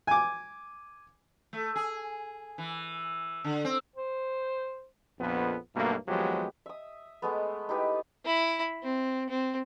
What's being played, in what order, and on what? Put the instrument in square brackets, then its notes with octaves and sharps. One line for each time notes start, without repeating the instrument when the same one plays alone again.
[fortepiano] G#5 D6
[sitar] A3
G#4
E3
D3
C4
[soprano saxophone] C5
[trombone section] A#1 F2 B3
B1 G2 B2 A3 A#3
D#2 F3 F#3 G#3 B3 G4
[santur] E5 D#6
G#3 A3 B3
D#4 E4 G4 B4
[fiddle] E4 B5
C4
C4